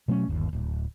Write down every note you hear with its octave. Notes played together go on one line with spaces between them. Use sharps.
B2 F#3 A3 C#4
G1 D#2
D1